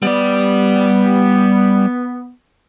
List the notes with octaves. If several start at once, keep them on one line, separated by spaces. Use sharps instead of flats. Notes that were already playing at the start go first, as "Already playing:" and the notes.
G3 B3 D5